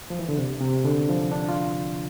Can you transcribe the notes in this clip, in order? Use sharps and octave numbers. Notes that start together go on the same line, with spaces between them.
F3
E3
D3
C3
C3
D3
F3
D4
F4